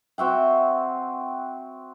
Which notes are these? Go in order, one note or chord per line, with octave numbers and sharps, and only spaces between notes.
C4 F#4 E5 G5